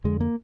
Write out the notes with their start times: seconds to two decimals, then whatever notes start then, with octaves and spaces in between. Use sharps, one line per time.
0.04 F2 D3 G#3
0.21 A#3